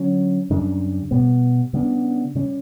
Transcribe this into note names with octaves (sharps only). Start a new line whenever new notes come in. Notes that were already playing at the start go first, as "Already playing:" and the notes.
Already playing: D3 F#3 C#4
F#2 C#3 G3 D4
B2 G3 B3
C#3 G3 B3 D4
C#3 G3 C#4